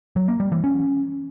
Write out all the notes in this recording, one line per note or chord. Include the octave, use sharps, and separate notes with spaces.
F#3
A#3
G3
E3
C#4